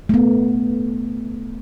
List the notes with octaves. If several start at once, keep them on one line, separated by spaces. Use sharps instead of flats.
A3 B3